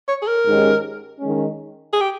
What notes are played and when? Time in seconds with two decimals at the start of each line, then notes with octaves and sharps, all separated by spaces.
0.08 C#5
0.22 G#4
0.27 A#4
0.46 G#2 D#3 G#3 C#4 G4
1.19 D#3 G#3 C#4
1.93 G#4
2.01 G4